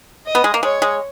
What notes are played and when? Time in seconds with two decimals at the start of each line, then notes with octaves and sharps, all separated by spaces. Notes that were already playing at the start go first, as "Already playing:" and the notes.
0.26 D#5
0.35 B3
0.44 G#3
0.54 A#3
0.63 G#3 C#5
0.82 G#3